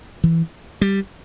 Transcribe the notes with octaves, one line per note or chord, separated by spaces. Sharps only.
E3
G3